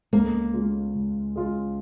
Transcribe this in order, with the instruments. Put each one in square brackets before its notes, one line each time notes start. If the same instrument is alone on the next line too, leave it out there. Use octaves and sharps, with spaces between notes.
[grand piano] C#2 [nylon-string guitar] A#3
[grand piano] C#3 G#3 F4
C#2
C#3 G#3 F4